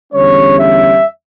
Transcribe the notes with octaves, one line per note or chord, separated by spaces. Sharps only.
E2 D3 G3 C#4 C#5
E5